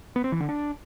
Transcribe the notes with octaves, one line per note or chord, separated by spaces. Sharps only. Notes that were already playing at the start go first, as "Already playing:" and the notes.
B3
C4
E3
D3
D4